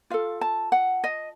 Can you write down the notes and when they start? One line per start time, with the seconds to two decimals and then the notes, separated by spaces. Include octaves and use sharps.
0.10 F4 A4 F5
0.41 A5
0.72 F#5
1.04 D#5